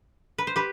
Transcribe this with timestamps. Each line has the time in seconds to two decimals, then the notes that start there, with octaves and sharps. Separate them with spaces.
0.38 B4
0.47 C5
0.56 G4 B4